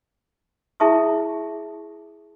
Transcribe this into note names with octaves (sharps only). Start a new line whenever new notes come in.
E4 G#4 E5 A5 C#6 D#6